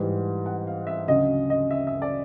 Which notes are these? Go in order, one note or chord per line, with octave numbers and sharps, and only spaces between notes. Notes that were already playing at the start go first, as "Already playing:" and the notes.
Already playing: G#2 E3 G3
F#5
F5
E5
D2 C#3 F#3 D#5
D#5
E5
E5
D5